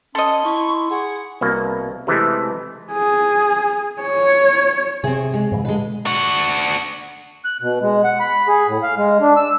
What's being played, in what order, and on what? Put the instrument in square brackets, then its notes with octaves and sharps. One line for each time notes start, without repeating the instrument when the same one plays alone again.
[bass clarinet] C#4 [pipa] A4 D#5 [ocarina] C6
[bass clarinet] E4 [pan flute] C#6
[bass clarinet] G#4 [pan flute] F#5
[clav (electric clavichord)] C2 B2 A#3
C3 E3 G#3 A3
[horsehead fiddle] G#4
C#5
[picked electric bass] C3 [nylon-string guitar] C4 G#4
[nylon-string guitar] G#3
[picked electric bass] G#2 C#3 E3
[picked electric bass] B2 D3 [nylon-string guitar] G#3 B4
[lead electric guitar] D4 F#4
[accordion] F#6
B2
G#3
F#5
B5
G#4
A2
F5
G#3
D4
E6